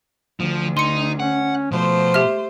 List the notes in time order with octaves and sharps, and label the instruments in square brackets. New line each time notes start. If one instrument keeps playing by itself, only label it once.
[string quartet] D2 [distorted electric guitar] F3
[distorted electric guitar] D#4 [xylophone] C6 C#7
[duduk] C#4 [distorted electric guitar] F#5
[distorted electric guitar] B2 [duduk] F3 [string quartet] A3 C5
[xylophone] G4 E5 F6